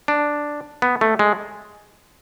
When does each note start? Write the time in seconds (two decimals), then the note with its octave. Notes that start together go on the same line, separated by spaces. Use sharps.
0.08 D4
0.82 B3
1.01 A3
1.19 G#3